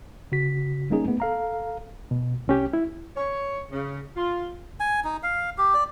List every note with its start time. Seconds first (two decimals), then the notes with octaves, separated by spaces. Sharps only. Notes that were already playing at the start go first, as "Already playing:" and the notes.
0.32 C#3 F#4 B6
0.90 G3 A#3 C#4 D#4 G#4
1.05 A3 B3
1.20 A4 F5 A#5
2.11 B2
2.48 C2 C#4 G4
2.73 E4
3.16 C#5
3.71 C#3
4.16 F4
4.80 G#5
5.04 D#4
5.23 F5
5.58 G4
5.74 D5